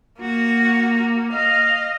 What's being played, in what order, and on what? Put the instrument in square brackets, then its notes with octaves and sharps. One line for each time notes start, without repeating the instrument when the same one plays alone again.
[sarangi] A#3 [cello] F#4
[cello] D#5 [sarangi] F5